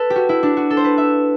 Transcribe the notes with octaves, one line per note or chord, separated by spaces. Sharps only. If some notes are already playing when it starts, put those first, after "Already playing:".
Already playing: A4 B4
G4
F#4
E4
D4
F#4
A4
C5
B4
E5